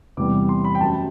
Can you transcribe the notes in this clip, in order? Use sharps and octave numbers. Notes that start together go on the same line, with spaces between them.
E2 C3 E3 G3 D6
C6
B5
G5
F#2 F#3 A5